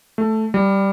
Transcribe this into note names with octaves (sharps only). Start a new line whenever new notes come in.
A3
G3